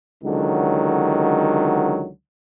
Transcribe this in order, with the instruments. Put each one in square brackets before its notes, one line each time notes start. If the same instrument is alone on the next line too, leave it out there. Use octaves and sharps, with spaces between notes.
[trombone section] C#2 D3 D#3 F#3